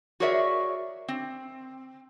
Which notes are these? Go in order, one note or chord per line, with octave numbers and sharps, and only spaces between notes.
F#4 G#4 A#4 C#5 D5 E5
C4